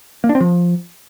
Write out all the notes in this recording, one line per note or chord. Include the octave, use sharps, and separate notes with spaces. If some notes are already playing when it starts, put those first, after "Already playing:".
A#3
D4
C4
F3